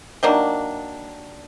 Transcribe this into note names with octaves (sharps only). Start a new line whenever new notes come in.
D#3 F#3 A#3 D4